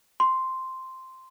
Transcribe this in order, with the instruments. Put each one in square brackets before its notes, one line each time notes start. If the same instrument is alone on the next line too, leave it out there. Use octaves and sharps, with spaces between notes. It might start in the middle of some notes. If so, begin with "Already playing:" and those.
[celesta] C6